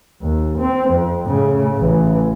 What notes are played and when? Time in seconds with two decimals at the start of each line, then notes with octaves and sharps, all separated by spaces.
0.22 D#2
0.59 C4
0.90 F2
1.27 A2 C#3
1.77 A1 E3